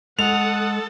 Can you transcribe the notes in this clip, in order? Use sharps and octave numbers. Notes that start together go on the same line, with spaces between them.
G#3 A4 F#5 D#6 F7